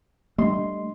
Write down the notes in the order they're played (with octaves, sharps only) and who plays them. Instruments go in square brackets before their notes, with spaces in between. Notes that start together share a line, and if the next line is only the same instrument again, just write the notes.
[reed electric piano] G3 D#5 C6 [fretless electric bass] A3 D4